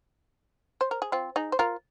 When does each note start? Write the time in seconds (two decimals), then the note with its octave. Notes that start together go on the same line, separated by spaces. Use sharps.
0.81 C5
0.91 A#4
1.02 G#4
1.12 C4 F4
1.36 D#4 G#4
1.52 C5
1.59 F4 A#4